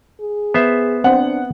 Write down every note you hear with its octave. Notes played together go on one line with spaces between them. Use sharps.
G#4
B3 C5 E5
C4 D4 F#5